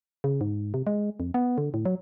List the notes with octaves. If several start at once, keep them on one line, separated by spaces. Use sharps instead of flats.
C#3
G#2
C3
G#3
F2
B3
D3
A2
F#3